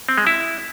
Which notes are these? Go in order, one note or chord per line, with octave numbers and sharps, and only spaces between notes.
C4
G#3
E4